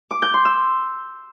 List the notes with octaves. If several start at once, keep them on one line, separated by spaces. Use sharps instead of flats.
D6
G6
C6
E6